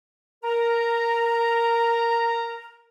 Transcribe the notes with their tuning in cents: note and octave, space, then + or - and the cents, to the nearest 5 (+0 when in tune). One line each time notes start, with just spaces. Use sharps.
A#4 +0 A#5 -10